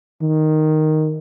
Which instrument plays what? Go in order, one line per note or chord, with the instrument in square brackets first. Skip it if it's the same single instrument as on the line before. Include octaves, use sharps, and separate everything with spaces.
[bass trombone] D#3